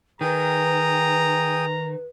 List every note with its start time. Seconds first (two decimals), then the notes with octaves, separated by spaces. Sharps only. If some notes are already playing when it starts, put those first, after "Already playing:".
0.21 D#3 G#4 B4 G5 A#5 D#6